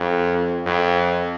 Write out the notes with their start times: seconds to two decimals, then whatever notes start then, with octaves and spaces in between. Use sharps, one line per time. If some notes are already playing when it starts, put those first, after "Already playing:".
Already playing: F2
0.66 F2